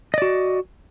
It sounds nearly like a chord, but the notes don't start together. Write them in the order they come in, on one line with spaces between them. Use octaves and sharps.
D#5 D5 F#4